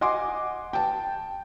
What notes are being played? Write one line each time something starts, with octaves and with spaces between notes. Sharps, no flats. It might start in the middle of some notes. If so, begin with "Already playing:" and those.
D#5 F#5 G#5 C6 D6
G5 A5